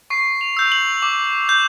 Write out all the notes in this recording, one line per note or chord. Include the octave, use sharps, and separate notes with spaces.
C#6 C7
F7
E6 G6 F7
F#7
D6
G6